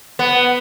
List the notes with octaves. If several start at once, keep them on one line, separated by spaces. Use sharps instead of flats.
B3